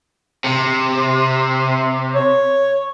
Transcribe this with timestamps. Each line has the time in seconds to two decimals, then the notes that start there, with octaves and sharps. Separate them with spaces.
0.44 C3
2.15 C#5